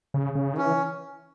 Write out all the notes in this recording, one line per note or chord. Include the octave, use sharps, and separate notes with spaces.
C#3
C#3
D#3
E3 C#4